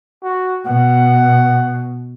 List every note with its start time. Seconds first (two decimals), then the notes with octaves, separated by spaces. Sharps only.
0.23 F#4
0.65 B2 F#5